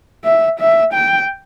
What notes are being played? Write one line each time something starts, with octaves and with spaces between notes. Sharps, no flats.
E5
E5
G5